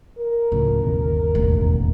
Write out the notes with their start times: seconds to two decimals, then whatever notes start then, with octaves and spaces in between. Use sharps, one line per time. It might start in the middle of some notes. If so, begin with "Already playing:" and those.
0.19 A#4
0.52 C#2 A2 C#3 F3
0.83 G1 D#2 B2
1.35 E1 A1